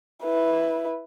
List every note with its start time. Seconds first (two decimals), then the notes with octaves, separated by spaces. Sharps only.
0.23 E4 B4